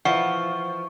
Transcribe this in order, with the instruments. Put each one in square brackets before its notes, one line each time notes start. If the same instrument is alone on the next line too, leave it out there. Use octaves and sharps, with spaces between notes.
[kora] E3 E4 [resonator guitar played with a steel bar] F3 [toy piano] F#5 [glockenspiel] C#6